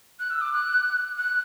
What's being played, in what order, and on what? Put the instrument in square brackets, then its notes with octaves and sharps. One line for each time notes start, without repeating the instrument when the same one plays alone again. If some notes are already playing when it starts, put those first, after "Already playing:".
[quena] F#6
E6
D6
F#6
F#6